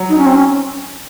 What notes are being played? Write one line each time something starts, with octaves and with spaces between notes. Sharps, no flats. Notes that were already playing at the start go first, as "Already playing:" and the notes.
Already playing: F#3
D#4
C#4
C4
C#4